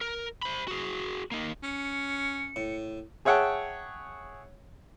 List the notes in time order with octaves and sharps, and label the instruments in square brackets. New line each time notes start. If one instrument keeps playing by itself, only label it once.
[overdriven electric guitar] A#4
C5 B5
F#4 G#4
A#3 D#4
[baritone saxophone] C#4 [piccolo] C#7
[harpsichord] A2
[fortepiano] G#4 C#5 E5 F#5 G5 A5